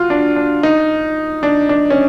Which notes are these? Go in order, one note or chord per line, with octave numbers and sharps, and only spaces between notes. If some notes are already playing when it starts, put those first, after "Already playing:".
Already playing: F4 F#4
D4
D4
D#4
D4
D4
C#4